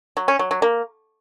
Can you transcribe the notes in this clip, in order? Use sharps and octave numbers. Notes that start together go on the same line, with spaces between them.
F#3
C#4
F#3
F#3
A#3